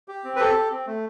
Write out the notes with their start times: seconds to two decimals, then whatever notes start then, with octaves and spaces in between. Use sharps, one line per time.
0.08 G4
0.24 C4
0.36 B4
0.40 G4 A4
0.55 G4
0.71 C4
0.87 A3